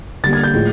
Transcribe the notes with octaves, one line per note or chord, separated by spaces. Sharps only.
D3 G3 A#3 A6
G#6
G6
A2 F3 G#3